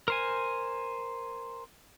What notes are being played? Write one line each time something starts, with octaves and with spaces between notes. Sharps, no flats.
A#4 C5 G#5